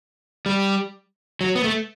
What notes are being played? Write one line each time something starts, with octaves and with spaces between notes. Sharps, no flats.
G3
F#3
B3
A3